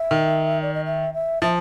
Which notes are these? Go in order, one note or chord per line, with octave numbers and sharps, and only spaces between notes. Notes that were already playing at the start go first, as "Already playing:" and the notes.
Already playing: E5
D#3
D5
D#5
E5
E5
F3 E5